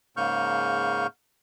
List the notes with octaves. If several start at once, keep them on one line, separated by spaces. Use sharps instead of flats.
G#2 C#3 A#3 C#6 F6 G6